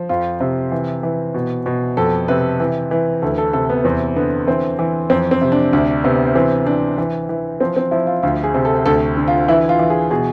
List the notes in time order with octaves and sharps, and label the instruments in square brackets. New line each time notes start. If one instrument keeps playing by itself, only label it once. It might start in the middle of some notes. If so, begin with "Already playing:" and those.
Already playing: [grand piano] F3
F2 F4
C3
E3
E3
B2
B2
F2 A4
C3 B4
E3
E3
D2 A4
A4
C3 A4
B3
E2 C4
D3 B3
E3 C4
E3
F2 C4
C4
C3
D4
D2 D4
C3 B3
E3 C4
E3 D4
E3
E3
F3 C4
C4
F3 E4
F4
D2 F4
G#4
C3
A4
D2 A4
D3
F4
E3 E4
F4
E3
G#4
B2 G#4